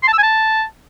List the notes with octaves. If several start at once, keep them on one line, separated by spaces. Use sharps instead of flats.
C6
A5
E6
G#5
A5